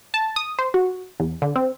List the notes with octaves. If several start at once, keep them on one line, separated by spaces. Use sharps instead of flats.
A5
D#6
C5
F#4
E2
D3
C4